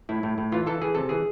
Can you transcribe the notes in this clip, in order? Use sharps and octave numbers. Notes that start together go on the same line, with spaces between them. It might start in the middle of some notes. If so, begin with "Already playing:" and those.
A2 E4
A2
A2
E3 F4
E3 A4
E3 G#4
C3 A4
E3 G#4